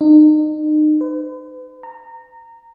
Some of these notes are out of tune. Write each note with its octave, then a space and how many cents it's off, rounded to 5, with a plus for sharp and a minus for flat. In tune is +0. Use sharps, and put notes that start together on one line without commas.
D#4 -35
B4 +45
A#5 -20